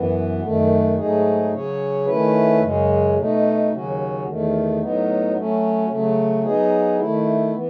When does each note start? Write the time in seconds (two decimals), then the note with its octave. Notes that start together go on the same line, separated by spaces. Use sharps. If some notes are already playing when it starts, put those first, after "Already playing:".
Already playing: F#2 E3 B3
0.41 F#2 D#3 A3
0.96 G#2 F#3 A3 D#4 G#4
1.51 C#3 F#3 C#4 G#4 C#5
2.05 D#3 A3 C#4 E4 B4
2.60 F#2 C#3 G#3 C#4
3.15 B2 A3 D#4
3.69 D#2 C#3 F#3 C#4 F#4
4.24 E2 D#3 A3
4.79 A2 F#3 B3 D#4
5.33 F#3 A3 C#4
5.88 C#3 F#3 A3
6.43 F#3 B3 D#4 G#4
6.97 D#3 A3 E4
7.53 E3 B3